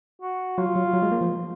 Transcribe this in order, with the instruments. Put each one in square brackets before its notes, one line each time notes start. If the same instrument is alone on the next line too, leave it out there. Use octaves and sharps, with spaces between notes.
[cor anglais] F#4
[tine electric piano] F#3 [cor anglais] F4
[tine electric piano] F#3
F#3
G#3
A#3
F3